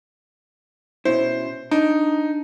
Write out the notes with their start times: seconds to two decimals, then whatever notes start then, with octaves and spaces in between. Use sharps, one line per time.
1.05 B2 C#4 E4 C5
1.71 D4 D#4